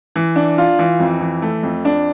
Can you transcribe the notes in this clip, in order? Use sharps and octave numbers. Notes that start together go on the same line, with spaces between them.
E3
D4
F4
E3
F2
E3
A3
F2
D4